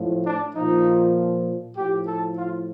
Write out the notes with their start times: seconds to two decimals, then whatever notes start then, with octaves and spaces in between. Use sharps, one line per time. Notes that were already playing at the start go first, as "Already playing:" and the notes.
Already playing: A2 F3
0.24 D4
0.54 A#2 F3 D#4
1.75 A2 F3 G4
2.05 A4
2.36 F4